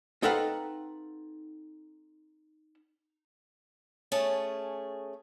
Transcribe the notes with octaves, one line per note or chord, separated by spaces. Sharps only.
C4 D#4 A4 B4 F5 F#5
A3 C#4 G#4 A5